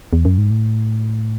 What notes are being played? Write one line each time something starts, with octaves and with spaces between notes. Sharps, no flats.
E2
F#2
G#2
A2